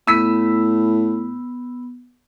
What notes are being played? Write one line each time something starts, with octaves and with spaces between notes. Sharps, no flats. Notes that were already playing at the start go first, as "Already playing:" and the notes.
A2 B3 E6 B6